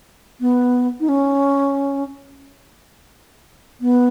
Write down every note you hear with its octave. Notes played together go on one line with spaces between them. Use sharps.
B3
D#4
C#4
B3